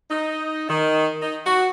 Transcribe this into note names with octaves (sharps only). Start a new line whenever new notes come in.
D#4
D#3
D#4
F#4